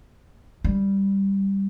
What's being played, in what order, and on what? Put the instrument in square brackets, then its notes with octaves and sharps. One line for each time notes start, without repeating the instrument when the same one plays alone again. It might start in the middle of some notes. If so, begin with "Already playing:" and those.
[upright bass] G3